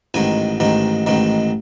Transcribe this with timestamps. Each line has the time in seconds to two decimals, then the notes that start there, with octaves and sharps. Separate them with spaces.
0.14 A1 G#2 D#3 G#5
0.60 A1 G#2 D#3
1.06 A1 G#2 D#3